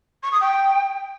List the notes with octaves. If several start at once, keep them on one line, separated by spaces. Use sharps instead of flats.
C#6
D#6
G5